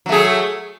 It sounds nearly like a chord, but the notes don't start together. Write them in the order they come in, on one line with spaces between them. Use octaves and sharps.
F#3 A3 G#4